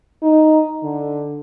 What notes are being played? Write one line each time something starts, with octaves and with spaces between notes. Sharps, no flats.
D#4
D3